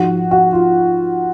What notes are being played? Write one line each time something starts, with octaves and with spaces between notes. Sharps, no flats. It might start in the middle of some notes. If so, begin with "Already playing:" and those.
Already playing: G#2 F3 F#4
F#4
F4